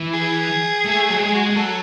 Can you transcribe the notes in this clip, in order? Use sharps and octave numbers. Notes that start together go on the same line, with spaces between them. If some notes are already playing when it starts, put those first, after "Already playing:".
Already playing: E3
G#4
A3
F#3
G#3
F#4
G#3 G#4
F#3 A4